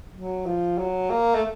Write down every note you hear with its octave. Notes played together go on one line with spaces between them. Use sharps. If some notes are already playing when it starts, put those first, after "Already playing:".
F#3
F3
F#3
A#3
A3